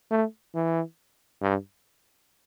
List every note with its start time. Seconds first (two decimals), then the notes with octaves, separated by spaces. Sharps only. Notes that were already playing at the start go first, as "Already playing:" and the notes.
0.11 A3
0.55 E3
1.42 G2